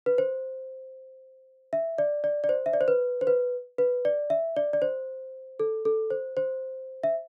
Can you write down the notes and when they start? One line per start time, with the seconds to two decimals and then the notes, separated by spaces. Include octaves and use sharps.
0.06 B4
0.18 C5
1.73 E5
1.98 D5
2.24 D5
2.44 D5
2.49 C5
2.66 E5
2.73 D5
2.81 C5
2.88 B4
3.21 C5
3.27 B4
3.78 B4
4.05 D5
4.30 E5
4.57 D5
4.73 D5
4.82 C5
5.60 A4
5.85 A4
6.10 C5
6.37 C5
7.03 E5